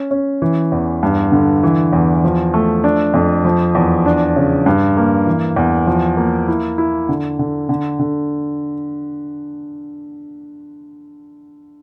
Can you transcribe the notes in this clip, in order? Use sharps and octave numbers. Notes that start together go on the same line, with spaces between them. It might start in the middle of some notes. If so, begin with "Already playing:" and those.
Already playing: C#4
C#4
E3
E2
G2
D3
E3
E2
F3
A3
D4
F2
F3
E2
D4
C#3
G2
A#3
E3
E2
F3
A#3
E4
E4
D3
D3
D3
D3